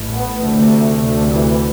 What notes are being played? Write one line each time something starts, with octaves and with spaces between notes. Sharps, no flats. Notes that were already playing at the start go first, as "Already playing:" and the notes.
Already playing: A1 A2
B3
D2 C3 A3
D2 C3
E3